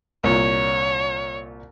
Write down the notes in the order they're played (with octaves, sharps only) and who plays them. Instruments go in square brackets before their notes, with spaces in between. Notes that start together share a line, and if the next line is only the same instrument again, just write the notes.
[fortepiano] C2 A#2 [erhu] C#5